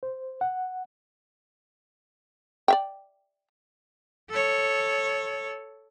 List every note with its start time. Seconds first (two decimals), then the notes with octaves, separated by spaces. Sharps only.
0.03 C5
0.41 F#5
2.68 D5 E5 G5
4.31 A4 C#5